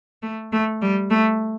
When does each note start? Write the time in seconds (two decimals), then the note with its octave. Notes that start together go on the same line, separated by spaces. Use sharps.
0.23 A3
0.52 A3
0.82 G3
1.10 A3